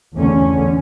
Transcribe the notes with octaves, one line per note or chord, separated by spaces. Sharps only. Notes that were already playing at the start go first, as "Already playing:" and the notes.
E2 D3 A3 C#4